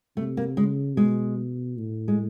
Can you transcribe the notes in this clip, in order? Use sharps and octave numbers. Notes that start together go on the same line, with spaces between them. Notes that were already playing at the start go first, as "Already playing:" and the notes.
C3 A3
A#3
C#3 G#3
B2 G#3
A2
G#3